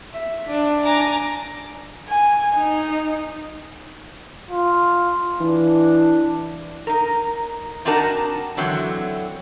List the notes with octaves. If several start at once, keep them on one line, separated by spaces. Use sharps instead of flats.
E5
D4
G#5 A#5 D6
G#5
D#4
F4
E3 D4
D#4 A#4
C4 D4 D#4 F#4 A#4 A5
D3 E3 F#3 C4